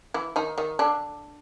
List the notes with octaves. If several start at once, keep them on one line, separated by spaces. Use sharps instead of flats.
E3 E4
D#3 D#4
D#3 D#4
D3 D4